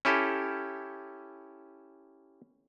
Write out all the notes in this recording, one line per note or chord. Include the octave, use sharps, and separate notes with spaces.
C#4 E4 G4 A4